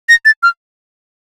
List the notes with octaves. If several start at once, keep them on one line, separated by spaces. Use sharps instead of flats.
A#6
A6
F6